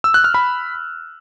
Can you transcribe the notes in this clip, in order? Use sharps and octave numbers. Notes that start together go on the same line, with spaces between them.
E6
F#6
F6
B5